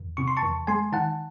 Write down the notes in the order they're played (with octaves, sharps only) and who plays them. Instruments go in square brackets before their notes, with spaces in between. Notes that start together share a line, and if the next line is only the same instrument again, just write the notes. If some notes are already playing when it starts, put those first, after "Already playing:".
Already playing: [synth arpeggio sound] E2
C3 C#6
C6
A5 C#6
E2
G#3 G#5 C6
D#3 F#5 A5